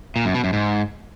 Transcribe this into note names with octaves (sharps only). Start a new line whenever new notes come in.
A#2
F#2
B2
F#2
G#2